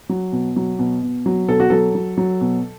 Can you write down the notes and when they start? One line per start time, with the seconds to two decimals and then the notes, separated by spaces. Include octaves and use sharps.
0.09 F#3
0.32 B2
0.56 F#3
0.79 B2
1.03 B2
1.26 F#3
1.48 B2 A4
1.60 F#4
1.70 F#3 A4
1.95 F#3
2.18 F#3
2.41 B2